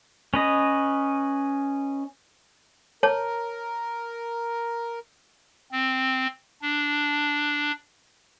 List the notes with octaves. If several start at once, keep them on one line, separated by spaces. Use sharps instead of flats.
C#4 B4 D#5
A#4 C#5 A5
C4
D4